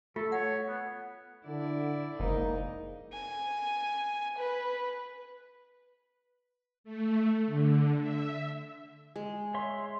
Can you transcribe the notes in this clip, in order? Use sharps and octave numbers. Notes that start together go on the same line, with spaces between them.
A3 F4 A4
C#5 F#5
B3
D3 E4 D5
F#1 G#2 A#3 D#4
G#5
B4
A3
D3
E5
G#3
C#5 E5 C6